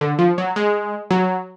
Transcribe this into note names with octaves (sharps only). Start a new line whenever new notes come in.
D3
F3
F#3
G#3
F#3